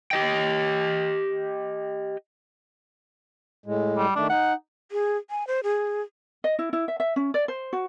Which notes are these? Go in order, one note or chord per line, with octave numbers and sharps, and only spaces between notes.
G4 D#5 G5
A2 G#3
G3
D#3 A3 D4
D#4 F#5
G#4
G#5
C5
G#4
D#5
E4
E4
E5
E5
C#4
D5
C5
F#4